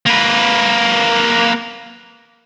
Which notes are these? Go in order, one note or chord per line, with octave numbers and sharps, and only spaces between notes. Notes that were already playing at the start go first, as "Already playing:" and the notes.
A#3 B4